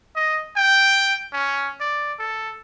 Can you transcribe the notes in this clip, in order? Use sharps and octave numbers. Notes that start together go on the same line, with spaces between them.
D#5
G5
C#4
D5
A4